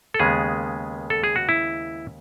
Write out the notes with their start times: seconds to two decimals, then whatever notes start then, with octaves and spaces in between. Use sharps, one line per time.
0.14 A4
0.19 D#2 C#3 G#3 B3 G#4
1.10 A4
1.24 G#4
1.36 F#4
1.49 E4